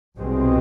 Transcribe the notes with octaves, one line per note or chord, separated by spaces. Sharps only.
C2 B2 G#3 C4